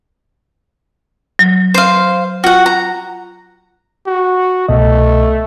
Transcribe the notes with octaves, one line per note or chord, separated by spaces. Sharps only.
F#3
C5 F5
F4 F#4 F#5 G5
A#5
F#4
C2 B2 A3 D#5